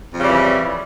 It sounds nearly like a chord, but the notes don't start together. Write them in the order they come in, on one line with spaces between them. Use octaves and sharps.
F2 C#3 G3 E3